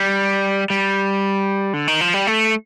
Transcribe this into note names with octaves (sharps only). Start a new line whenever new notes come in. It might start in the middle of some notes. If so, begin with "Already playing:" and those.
Already playing: G3
G3
D3
D#3
F3
G3
A3